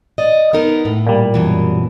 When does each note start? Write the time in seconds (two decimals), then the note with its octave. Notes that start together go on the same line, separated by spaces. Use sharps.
0.18 D5 D#5
0.53 B3 D#4 A#4
0.85 A2
1.07 A#2 G3
1.34 F#2 B2 E3